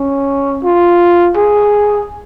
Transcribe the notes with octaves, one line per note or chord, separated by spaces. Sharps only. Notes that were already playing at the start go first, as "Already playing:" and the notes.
Already playing: C#4
F4
G#4